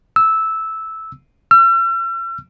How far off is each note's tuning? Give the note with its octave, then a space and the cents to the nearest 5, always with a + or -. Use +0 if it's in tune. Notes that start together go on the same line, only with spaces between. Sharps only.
E6 -10
E6 +45